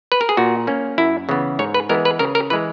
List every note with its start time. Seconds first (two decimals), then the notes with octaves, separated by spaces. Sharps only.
0.12 B4
0.21 A#4
0.29 G#4
0.37 A#2 F#4
0.67 A#3 C#4
0.98 F#2 E4
1.29 C#3 E3 B3
1.59 G#2 C#5
1.74 B4
1.89 E3 G#3 B3 A#4
2.05 B4
2.19 C#3 A#4
2.35 A#4
2.50 E3 G#3 B4